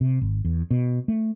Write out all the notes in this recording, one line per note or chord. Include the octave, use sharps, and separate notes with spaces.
C3
G#1
E2
B2
A3